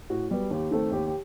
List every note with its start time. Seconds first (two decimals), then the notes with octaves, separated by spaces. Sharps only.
0.10 A2 F#4
0.30 G3 B3 F#4
0.50 D#2 G4
0.71 D#3 A3 C4 A4
0.92 D#2 G4
1.07 G4